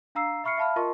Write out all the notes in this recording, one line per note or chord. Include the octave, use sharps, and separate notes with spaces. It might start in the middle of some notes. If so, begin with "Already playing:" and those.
D4 F5 A#5 E6 C7
E5 B5 C#6 F6 C7 C#7
E5 F5 A5 B5 F6
F4 A#4 D#5 A5 C6 C#6